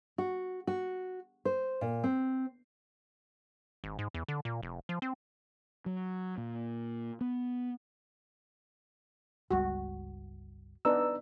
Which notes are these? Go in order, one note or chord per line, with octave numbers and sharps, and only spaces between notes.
F#4
F#4
C5
A#2
C4
G#1
G#2
E2
D3
A#2
F1
F3
C4
F#3
A#2
B3
G1 C#2 G3 F#4
B3 D4 D#4 B4 A#5 E6